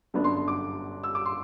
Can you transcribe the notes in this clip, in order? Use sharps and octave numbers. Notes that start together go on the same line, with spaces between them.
G1 F#2 F#3 B3 D4
C6
C6
D6
E6
D6
C6